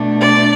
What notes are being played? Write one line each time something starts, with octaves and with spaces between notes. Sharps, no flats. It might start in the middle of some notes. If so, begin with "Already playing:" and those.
Already playing: B2 A3 D4
D5